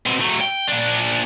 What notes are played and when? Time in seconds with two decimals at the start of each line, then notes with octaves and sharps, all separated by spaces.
0.06 B2 C4
0.21 F#3 A3
0.41 G5
0.68 A#2 D4